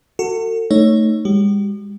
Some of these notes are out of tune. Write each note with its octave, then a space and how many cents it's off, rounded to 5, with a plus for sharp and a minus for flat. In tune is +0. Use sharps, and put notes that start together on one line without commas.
F#4 +0 A4 +40
A3 +10 D#4 +0 C#5 +0
G#3 -45 G4 -45